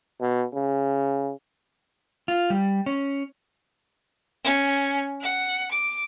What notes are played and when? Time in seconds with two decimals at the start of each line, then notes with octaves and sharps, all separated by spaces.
0.21 B2
0.54 C#3
2.28 F4
2.50 G3
2.86 C#4
4.44 C#4
5.21 F#5
5.71 D6